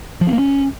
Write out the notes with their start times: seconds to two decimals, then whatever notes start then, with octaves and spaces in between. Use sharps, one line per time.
0.21 F3
0.27 C4
0.33 A#3
0.39 C#4